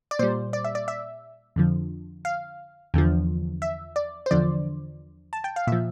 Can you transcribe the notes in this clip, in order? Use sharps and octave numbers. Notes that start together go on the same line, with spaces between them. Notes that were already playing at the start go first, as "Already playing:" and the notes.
D5
A#2 G3 C5
D5
E5
D5
E5
F2 D3 F3
F5
E2 D3 F3
E5
D5
C5
E2 D3 F3 D5
A5
G5
F5
A#2 F3 E5